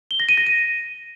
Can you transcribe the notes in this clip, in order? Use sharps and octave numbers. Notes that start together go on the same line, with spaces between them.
G7
A#6
D#7
A#6
D#7